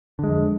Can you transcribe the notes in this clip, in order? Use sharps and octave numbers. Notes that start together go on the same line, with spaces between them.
F2 D3 G#3